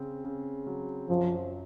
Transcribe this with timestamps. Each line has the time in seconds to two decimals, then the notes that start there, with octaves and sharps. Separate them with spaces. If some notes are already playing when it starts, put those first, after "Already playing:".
Already playing: C#3 C4
0.25 C#3
0.67 F#3
1.09 F#2 F3